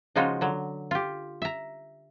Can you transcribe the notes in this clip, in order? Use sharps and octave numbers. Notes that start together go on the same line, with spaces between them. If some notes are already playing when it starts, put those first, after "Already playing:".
C#3 F3 G#3 D#4 F4 F#4
D3 F#3
F4 G4
E5 A#5